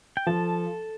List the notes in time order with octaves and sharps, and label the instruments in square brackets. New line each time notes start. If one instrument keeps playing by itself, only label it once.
[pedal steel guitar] G5
[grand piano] F3 [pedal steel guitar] A4 A5